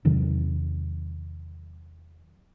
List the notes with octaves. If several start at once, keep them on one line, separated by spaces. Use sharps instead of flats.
E2 C3 D#3 F#3